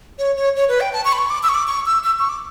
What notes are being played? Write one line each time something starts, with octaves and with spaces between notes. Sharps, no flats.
C#5
C#5
C#5
B4
G5
A5
C#6
B5
C#6
D6
E6
C#6
D6
C#6
E6
E6
C#6
D6